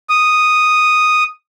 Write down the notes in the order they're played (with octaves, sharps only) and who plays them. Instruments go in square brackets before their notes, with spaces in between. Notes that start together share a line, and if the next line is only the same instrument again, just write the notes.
[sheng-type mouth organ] D#6